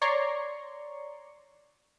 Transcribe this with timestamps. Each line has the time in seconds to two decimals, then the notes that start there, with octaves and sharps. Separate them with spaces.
0.02 C#5 D5 A#5 C6 C#6